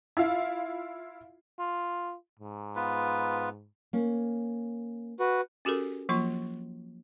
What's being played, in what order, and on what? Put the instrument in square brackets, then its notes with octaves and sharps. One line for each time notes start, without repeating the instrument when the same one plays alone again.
[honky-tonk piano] E4 F4 F5
[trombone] F4
G#2
[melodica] B3 F4 B4
[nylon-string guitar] A#3 C#4
[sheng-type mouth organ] F#4 B4
[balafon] C#4 F#4 G4 A4 A#4
F3 F#3 A#3 F4 C6 C#6